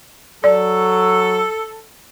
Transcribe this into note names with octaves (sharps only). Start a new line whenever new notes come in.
F#3 A4 D5